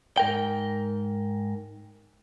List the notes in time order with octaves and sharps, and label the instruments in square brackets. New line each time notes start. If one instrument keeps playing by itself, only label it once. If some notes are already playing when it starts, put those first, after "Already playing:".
[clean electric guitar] G#2 A#4 G5